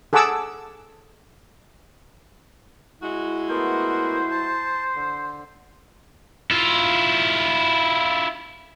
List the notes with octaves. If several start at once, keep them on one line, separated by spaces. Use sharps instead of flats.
G#4 A4 F#5 G#5 D6 E6
G#3 E4 F#4
A3 B3 A#4 C5
A5
D3
E4 F4